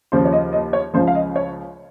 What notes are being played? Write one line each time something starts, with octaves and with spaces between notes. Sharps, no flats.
D#2 C#3 F3 C5
C#5
D#5
D#5
C#5
C#2 C#3 F3 C5
F5
D#5
C#5